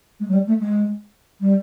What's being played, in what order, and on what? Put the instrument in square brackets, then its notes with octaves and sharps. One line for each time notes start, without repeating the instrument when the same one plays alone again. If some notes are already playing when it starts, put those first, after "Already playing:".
[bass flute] G#3
F#3
G3
A3
G#3
G3